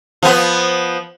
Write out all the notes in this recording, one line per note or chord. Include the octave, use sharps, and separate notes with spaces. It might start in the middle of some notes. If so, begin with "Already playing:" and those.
F3 B3